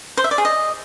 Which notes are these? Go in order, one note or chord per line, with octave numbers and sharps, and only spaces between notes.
C5
E5
D5
G#4
D#5